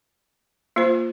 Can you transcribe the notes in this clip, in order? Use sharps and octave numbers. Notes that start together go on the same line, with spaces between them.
A#3 F4 C5